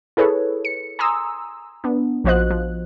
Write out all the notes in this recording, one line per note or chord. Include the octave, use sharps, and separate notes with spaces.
E4 G#4 A4 B4 C#5
C#7
G#5 A#5 C6 D#6 E6
B3 D4
A#1 F3 F#4 C5 D#5 F#6
F3